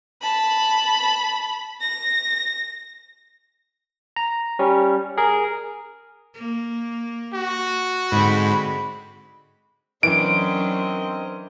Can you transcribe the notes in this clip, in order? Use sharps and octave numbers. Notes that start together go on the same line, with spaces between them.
A5 B5
A#6
A#5
G3 C#4
G#4 A#4
A#3
F#4
G#2 D3 G#3 C4 B5
F#2 E3 C4 D4 A#4 D#5 D7